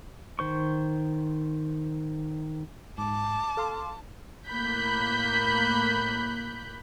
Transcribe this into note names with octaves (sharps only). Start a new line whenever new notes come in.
D#3 C5 C#6
G#2 A5 D6
A4 F5 C6
A2 A#3 B5 F#6 G6 B6